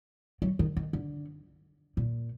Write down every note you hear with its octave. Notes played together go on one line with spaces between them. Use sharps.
F#3
D#3
D#3
D3
A#2